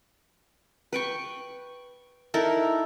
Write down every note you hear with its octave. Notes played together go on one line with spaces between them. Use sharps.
B4 G5 C#6
D#4 E4 A4 A#4